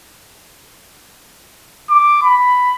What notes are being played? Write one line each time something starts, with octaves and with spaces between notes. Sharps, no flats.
D6
B5